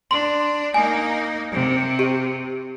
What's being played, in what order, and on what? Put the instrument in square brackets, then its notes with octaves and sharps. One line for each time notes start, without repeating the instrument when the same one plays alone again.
[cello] D4 [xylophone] C6
[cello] A#3 D#4 [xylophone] G#5
[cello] C3
[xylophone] G4